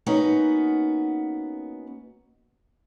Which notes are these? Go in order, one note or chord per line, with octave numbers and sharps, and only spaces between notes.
A#3 B3 C#4 D#4 F#4